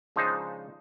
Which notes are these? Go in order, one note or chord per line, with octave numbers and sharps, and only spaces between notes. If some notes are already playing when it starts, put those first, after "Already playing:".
C#3 F3 G#3 D4 D#4 C5